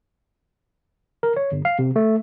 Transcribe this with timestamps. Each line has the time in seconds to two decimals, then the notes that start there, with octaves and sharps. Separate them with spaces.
1.23 A#4
1.37 C#5
1.52 G1
1.65 F5
1.79 C3
1.96 A3